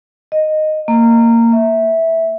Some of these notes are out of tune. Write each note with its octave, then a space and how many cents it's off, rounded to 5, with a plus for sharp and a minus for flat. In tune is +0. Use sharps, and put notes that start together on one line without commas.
D#5 -5
A#3 -15
E5 -10